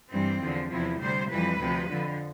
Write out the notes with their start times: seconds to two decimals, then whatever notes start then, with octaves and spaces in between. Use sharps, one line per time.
0.12 G2 E3 G3 C4
0.41 E2 D3 F3
0.70 E2 C3 F3 E4
1.00 D2 C3 G3 C5
1.30 F2 E3 G3 B4
1.60 D2 C3 F3
1.89 F2 D3 F3